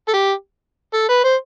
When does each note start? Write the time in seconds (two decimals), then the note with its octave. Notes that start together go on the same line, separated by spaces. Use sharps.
0.08 A4
0.13 G4
0.94 A4
1.09 B4
1.24 C5